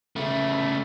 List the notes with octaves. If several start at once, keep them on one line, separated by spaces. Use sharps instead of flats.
C#3 A3